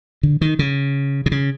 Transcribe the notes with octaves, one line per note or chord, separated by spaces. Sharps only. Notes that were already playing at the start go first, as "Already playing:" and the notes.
D3
D#3
C#3
C3
C#3